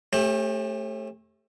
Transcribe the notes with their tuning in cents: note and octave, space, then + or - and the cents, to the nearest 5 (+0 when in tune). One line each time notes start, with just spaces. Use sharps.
A3 -5 C#4 -40 G4 +20